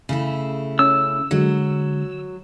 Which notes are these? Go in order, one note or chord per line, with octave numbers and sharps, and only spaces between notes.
C#3 A3 E4
C#4 E6
D3 F#3 G#3